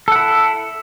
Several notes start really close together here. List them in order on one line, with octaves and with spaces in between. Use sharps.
A4 F#5 E4